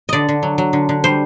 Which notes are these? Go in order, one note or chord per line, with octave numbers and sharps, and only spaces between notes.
D3 D5 D#5
D3
F#3
F#3
D3
D3
G3 C5